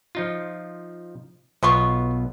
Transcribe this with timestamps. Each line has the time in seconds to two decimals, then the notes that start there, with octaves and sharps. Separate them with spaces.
0.15 F3 D#4 F4
1.63 B1 B3 F4 D#5 C6 C#6